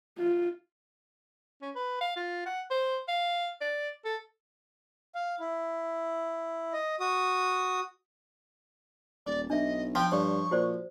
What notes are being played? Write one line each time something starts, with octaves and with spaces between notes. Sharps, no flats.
F4
C#4
B4
F5
F4
F#5
C5
F5
D5
A4
F5
E4
D#5
F#4 D#6
D#1 D5 D6
B1 D4 D#5 E5
F3 G5
G2 C#5 D5 C#6
A#2 F#4 C5 D5